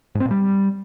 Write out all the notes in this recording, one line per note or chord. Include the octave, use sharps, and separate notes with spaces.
G#2
C4
A#2
G3